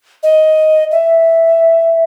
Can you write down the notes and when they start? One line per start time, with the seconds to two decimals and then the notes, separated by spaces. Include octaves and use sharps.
0.23 D#5
0.92 E5